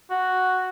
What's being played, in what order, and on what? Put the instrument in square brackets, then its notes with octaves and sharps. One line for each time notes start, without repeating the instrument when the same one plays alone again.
[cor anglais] F#4